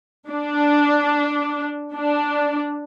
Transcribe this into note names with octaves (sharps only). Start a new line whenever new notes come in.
D4
D4